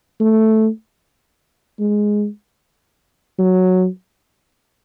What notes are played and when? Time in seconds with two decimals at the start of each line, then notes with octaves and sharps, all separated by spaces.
0.20 A3
1.79 G#3
3.39 F#3